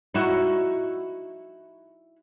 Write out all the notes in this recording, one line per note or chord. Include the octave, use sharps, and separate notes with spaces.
D#4 E4 F#4